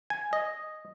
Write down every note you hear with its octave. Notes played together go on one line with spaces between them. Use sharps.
G#5
D#5